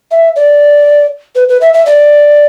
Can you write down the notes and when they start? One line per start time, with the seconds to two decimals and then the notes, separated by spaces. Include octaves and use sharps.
0.11 E5
0.36 D5
1.36 B4
1.49 B4
1.61 E5
1.74 E5
1.86 D5